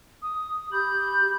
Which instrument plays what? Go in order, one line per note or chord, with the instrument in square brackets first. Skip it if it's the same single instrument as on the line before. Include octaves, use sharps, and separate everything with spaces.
[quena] D#6
[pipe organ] G4 B5 [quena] G6